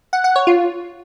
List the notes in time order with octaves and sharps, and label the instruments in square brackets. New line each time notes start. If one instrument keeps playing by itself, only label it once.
[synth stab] F#5
F#5
C#5
F4